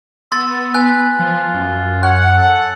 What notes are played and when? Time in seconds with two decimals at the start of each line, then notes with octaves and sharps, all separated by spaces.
0.32 B3 C6 E6 A6
0.74 B4 G#5 F#6
1.19 F3 F4
1.54 F#2
2.03 C#5 F#5 F#6
2.36 A4